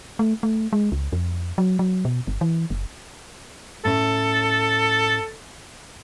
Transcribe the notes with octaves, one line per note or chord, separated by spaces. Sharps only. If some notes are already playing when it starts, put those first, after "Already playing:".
A3
A3
G#3
C#2
F2
F#3
F#3
B2
G1
E3
F#1
A2 C#4 A4